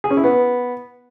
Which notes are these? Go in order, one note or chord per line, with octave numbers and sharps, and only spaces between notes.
G#4
C#4
E4
B3